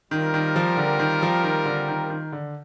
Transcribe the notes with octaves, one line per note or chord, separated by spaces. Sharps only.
D#3 G3 C4 F4 A#4
D#3
F3
D3
D#3
F3
D#3
D3
D#3
D#3
D3